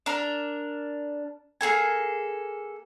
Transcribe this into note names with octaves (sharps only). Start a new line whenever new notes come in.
D4 A#4
A#3 G#4 A4 G#5